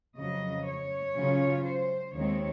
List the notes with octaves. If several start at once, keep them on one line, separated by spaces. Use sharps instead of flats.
F2 C#3 F#3 D#5
C#5
C#3 F#3 C#4 F4
C5
D#2 D#3 G#3 C4 C#5